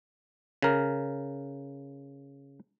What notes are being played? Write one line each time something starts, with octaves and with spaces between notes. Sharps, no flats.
C#3 A#4